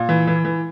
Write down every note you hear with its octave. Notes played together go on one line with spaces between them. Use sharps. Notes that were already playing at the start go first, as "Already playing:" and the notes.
Already playing: A#2
E3
E3
E3